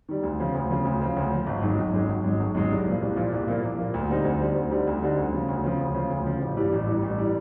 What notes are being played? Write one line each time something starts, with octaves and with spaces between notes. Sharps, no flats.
D#3 G3
D2
C#3 F3
D2
C#3 F3
D2
C#3 F3
D2
C#3 F3
G#1
F#2 D#3 G#3
G#1
F#2 D#3 G#3
G#1
F#2 D#3 G#3
G#1
F#2 D#3 G#3
C2
A#2 F3 A#3
C2
A#2 F3 A#3
C2
A#2 F3 A#3
C2
A#2 F3 A#3
D2
D3 G3 C4 D#4
D2
D3 G3 C4 D#4
D2
D3 G3 C4 D#4
D2
D3 G3 C4 D#4
D2
C#3 F3
D2
C#3 F3
D2
C#3 F3
D2
C#3 F3
A1
G2 E3 G3
A1
G2 E3 G3
A1
E3 G3